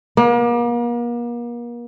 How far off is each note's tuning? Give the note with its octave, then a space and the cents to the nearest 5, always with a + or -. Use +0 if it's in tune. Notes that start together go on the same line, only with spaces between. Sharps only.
A#3 +40